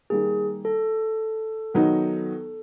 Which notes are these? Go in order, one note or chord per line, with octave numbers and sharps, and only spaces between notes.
D#3 G3 A#3 G#4
A4
D#3 F#3 B3 D#4